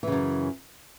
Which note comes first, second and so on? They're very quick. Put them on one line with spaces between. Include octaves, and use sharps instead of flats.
E3 C#3 F#2